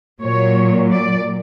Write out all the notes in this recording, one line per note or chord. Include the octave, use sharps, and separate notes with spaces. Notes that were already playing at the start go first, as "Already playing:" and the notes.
A#2 F#3 C#5
D5